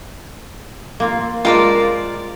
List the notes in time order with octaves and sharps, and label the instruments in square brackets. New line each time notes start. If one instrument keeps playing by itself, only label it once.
[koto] A#3 C4 F4
[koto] G#3 C5 A5 [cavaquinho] F4 A#4 D5